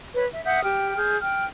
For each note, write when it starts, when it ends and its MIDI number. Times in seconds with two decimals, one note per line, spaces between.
0.14 0.26 71
0.14 0.26 73
0.32 0.44 76
0.44 0.63 76
0.44 0.63 78
0.44 0.63 87
0.44 0.63 91
0.63 0.96 67
0.63 0.96 79
0.63 0.96 89
0.96 1.17 68
0.96 1.17 89
0.96 1.17 91
1.21 1.44 79
1.21 1.44 89